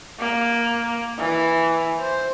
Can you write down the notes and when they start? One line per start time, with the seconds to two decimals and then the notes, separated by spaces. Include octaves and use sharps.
0.20 A#3
1.18 E3
2.00 C5